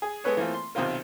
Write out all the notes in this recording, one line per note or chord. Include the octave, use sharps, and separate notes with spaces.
G#4
G#3 B3 A4 B4 C#5
E3 A3 A#3 C4 F4
C6
B1 C3 D#3 C4 F4 A#4